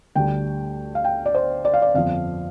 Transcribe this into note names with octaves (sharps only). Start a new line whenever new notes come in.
D2 D3 G3 G5
F5
G5
D5
C5
D5
F5
D5
G1 F2 F3 F5